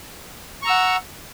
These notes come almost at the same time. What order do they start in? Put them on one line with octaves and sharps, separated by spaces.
C#6 A#5 E6 F#5